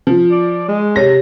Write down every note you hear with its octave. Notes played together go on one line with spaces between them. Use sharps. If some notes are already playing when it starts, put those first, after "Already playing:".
F3
D5
G#3
C3 G4 C#5 A#6